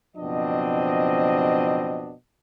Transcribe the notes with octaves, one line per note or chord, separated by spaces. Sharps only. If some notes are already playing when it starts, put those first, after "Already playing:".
F#1 B2 F3 C4 D4 D#5